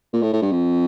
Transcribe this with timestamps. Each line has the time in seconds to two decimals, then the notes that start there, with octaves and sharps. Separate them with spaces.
0.13 A#2
0.22 A2
0.33 A2
0.42 G2
0.52 F2